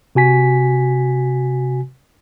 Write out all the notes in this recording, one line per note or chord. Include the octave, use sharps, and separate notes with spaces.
C3 F#4 G#5 B6